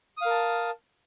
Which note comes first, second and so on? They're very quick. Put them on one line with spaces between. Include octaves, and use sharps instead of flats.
D#6 F5 A#4 A5